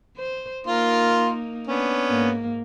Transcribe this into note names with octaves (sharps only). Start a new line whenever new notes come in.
C5
A#3 D#4 F4 A#4 C6
B3 C#4 D4
G#2 A#3